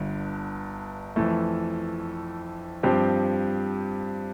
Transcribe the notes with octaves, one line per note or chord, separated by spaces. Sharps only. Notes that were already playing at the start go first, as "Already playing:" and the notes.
Already playing: G1 G2 D3
F2 E3 A3
G2 F3 C4 G4